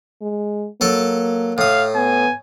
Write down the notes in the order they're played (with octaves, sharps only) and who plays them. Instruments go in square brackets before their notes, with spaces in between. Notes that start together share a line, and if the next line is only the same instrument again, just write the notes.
[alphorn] G#3
[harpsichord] F#3 A4 A5 [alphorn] A#3
[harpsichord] A2 D#6 [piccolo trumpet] F5
[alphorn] B3 [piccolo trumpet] G#5